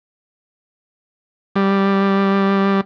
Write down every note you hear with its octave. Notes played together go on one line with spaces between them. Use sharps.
G3